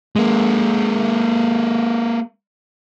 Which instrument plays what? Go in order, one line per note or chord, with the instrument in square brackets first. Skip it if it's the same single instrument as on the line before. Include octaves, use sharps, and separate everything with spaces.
[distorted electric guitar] G#3 A#3